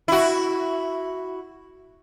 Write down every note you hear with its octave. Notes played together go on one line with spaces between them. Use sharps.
E4 F#4